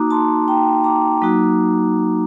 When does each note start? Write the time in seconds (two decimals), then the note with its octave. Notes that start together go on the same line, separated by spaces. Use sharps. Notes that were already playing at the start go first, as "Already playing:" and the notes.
Already playing: A#3 D#4 F#4 A#5 D6
0.11 A5 C6
0.48 G5 A#5
0.84 A#5 D6
1.22 F#3 A#3 D#4 F#4